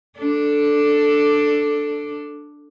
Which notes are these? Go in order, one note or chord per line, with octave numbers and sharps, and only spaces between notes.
D4 A4 D5